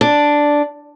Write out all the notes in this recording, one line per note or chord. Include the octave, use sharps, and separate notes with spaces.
D4